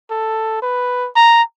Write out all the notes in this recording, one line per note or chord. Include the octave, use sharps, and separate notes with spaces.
A4
B4
A#5